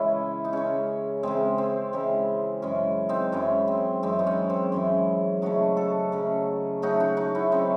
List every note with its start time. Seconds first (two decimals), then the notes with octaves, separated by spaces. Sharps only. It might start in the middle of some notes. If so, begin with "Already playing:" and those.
Already playing: C#3 E3 G#3 C#4 E4
0.44 D#4
0.53 C#3 E3 G#3 C#4
1.23 C#3 E3 G#3 C4
1.58 C4
1.93 C#3 E3 G#3 C4
2.62 F#2 E3 G#3 C#4
3.09 C4 D#4
3.32 F#2 E3 G#3 C#4
3.68 C4
4.03 F#2 E3 G#3 C4
4.19 D#4
4.27 C#4
4.50 C4
4.72 F#2 E3 G#3 C#4
5.42 C#3 F#3 A3 D#4 F#4
5.77 F#4 A4
6.12 C#3 F#3 A3
6.82 C#3 F#3 A3 D#4 F#4
7.00 D#4 F#4
7.17 D#4 F#4
7.35 C#4 E4
7.52 C#3 F#3 A3 C4 D#4